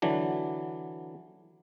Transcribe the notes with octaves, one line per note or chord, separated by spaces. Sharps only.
D3 E3 F#3 D4